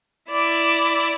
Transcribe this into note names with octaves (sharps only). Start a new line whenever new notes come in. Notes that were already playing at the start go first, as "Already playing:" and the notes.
E4 D5